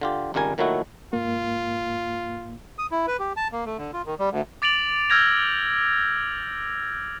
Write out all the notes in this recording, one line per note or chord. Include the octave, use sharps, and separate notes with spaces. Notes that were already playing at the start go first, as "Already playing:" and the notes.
D3 F4 G4
G#1 C#2 G3 A#4 G#5
A#2 D#3 F#3 A3 E4 F#4
G#2 A#3 F4
D#6
E4
B4
G4
A5
A#3
A3
D3
F4
D#3
G3
D2
D6 A6 D7 F7 F#7
E6 F6 G6 G#6 A#6 F7